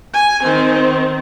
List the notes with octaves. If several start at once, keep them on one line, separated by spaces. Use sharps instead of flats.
G#5
D#3 C4